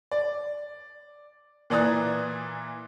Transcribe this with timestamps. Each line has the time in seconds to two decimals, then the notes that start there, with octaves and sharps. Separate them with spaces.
0.12 D5
1.70 A#2 E3 D5 A#5 D#6 F#6